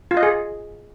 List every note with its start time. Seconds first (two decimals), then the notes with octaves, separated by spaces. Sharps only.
0.11 F4
0.17 D#5
0.23 G#4